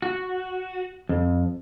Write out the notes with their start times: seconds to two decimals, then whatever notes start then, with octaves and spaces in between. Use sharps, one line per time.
0.02 F#4
1.09 F2